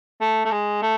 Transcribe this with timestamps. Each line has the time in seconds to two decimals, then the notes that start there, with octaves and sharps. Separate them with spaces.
0.21 A3
0.45 A3
0.51 G#3
0.82 A3